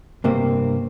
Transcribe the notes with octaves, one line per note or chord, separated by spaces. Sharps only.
G2 C3 A#3 C4